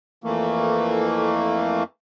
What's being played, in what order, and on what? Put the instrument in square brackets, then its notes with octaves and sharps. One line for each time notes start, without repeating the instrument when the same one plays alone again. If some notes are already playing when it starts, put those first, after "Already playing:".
[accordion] F2 E3 A3 A#3